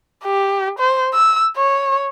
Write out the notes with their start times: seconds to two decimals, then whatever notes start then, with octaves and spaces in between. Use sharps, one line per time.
0.24 G4
0.79 C5
1.14 E6
1.57 C#5